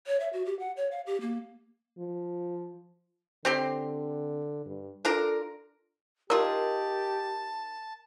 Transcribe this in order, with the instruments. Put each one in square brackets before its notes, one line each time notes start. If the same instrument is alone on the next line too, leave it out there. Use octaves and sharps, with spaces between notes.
[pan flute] C#5
E5
F#4
G4
F#5
C#5
F5
G4
A#3
[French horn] F3
[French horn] D3 [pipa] C4 G4 C6
[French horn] G2
[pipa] D4 F4 A#4 [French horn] A4
[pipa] D#4 F4 G#4 [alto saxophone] G4 [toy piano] A#4 [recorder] A5